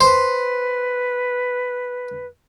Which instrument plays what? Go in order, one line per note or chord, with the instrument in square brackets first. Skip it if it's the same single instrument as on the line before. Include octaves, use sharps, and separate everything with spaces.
[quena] B4 [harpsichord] C5